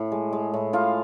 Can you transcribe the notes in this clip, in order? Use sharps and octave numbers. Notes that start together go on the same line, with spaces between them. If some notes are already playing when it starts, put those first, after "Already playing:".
Already playing: A2
G#3
G#3
A2
A2 F4 F5